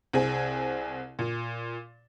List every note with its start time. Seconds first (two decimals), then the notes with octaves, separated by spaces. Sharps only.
0.13 C2 C4 G#4 G#5
1.19 A#2